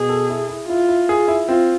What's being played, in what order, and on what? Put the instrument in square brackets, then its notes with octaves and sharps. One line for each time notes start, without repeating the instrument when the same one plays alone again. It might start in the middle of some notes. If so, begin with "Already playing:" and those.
Already playing: [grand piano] B2 [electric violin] G#4
[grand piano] A4
E4
E4
[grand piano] E4 [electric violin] F4
[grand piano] E4
G#4
E4
[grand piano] C4 [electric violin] F4